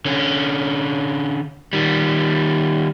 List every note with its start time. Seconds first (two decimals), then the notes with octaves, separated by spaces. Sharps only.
0.06 D3 C#4
1.73 D#3 G3